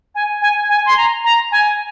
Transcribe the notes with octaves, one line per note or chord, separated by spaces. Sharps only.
G#5
G#5
G#5
C6
A#5
A#5
G#5